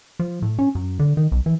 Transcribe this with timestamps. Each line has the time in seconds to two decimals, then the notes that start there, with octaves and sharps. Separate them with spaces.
0.19 F3
0.42 A2
0.59 C#4
0.75 F#2
0.99 D3
1.17 D#3
1.32 B1
1.46 E3